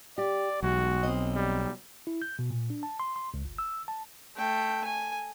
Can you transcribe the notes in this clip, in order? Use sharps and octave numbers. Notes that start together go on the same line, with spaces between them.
G4 D5
B1 E2 G#3 F#4
C4 D#5
G3
E4
G6
B2
A#2
D4
A5
C6
C6
C#2
G1
E6
A5
A3 G5
G#5